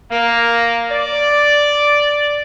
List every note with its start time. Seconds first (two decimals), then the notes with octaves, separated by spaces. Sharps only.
0.10 A#3
0.89 D5